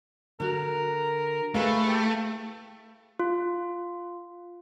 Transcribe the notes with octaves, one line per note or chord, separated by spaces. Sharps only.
D3 F#4 A#4
A3 E4 G#4 B4 F5
G4
F4